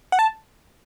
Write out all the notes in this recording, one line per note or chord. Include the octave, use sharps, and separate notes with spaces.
F#5
A5